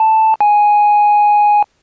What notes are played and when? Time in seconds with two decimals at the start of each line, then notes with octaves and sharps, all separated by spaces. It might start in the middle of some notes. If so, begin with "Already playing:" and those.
Already playing: A5
0.41 G#5